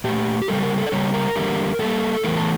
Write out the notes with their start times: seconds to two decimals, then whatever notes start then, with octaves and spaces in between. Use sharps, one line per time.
0.04 A#2 A3 G4
0.42 G4
0.48 C#3 G3 A#3 A4
0.63 A#4
0.78 A4
0.87 D5
0.92 C#3 G3 A#3 C#5
1.14 A#4
1.36 E2 D3 G3 A#3
1.79 A2 G3 A#3 A4
2.23 E2 C#3 E3 A3 A#4
2.37 A4